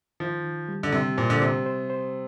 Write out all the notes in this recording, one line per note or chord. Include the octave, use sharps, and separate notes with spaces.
D#3 F3
D#3
G3
D3
C3 G3
A#2 C5
D3
C3 C5
C5
C5